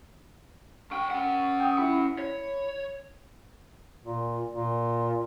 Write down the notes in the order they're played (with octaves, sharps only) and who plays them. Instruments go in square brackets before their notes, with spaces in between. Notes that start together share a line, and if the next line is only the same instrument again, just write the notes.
[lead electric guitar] B1 G5 [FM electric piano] C#6
[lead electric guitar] C#4 F#5
[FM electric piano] G5 D#6
E4 B5 C#7
[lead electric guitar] C#5
[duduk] A#2
A#2